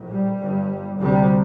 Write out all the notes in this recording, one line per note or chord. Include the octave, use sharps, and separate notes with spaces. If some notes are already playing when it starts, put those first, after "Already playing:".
Already playing: A#1 A2
G3
G1 G2
D2 C3 G3